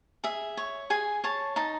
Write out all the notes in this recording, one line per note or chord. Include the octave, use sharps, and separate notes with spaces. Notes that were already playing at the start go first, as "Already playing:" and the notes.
G#4 E5
C#5
G#4 G#5
C#5 A5
D#4 A5